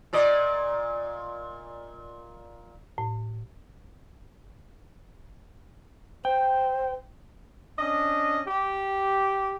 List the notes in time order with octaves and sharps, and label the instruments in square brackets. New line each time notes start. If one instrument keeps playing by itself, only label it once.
[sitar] A#2 D5 D#5
[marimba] A2
[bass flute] C5 [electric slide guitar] G5
[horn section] C#4 D4 D#5
G4